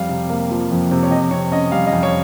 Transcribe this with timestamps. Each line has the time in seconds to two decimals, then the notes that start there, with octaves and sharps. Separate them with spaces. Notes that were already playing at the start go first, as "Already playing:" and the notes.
Already playing: F2 G3 F5
0.09 C3
0.30 A#3
0.51 F3
0.71 F2
0.91 C3
1.03 C#5
1.11 F2 D#5
1.31 C3 C#5
1.51 C#4 D#5
1.71 G3 F5
1.87 D#5
1.92 F2
2.03 C#5